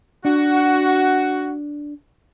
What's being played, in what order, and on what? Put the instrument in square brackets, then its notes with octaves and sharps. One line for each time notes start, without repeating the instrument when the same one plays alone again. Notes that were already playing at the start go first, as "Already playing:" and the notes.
[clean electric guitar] D4 [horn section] F#4